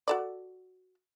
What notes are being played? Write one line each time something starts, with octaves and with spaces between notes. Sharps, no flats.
F#4 A4 D5